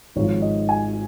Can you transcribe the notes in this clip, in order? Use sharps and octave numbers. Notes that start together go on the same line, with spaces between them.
G#1 G#2 F3 C#5
D#5
G#5